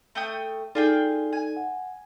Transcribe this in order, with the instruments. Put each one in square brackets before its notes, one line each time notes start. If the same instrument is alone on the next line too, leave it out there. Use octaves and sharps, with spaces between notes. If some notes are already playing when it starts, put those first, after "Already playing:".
[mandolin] A3 G5 D#6
[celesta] D#4 A4 D5 [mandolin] F4 G#4 G5
[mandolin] G#5
[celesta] F#5